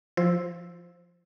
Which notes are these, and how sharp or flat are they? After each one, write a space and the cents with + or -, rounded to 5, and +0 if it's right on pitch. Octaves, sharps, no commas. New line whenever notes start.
F3 +0 C5 +0 E6 +0